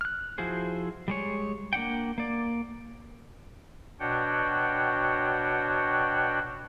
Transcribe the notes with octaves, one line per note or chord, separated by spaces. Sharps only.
F6 F#6
F3 E4 F#4 G#4 C5
G3 G#3 C#5
A#3 D4 F#5 G5
A#3 D5
B2 D4 F#4 C#5 F#5 G5